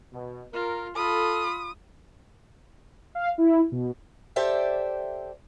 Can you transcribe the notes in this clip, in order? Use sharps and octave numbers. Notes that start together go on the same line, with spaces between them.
B2
F4 A#4
F4 A4 B5 D#6
F5
E4
B2
G4 A4 C5 D5 E5 G5